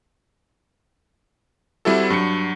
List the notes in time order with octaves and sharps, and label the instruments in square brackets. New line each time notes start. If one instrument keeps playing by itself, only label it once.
[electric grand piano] G3 C4 E4 F#4 A4
G2 F#3 C#7